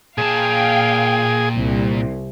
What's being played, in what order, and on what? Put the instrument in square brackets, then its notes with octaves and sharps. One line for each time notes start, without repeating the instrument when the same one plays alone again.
[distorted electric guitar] A#2 A5 [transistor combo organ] G#4 [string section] F5 G5
[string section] C2